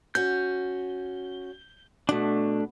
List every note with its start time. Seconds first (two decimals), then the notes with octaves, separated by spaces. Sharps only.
0.15 C#4 F#4 G6
2.09 B2 A3 D4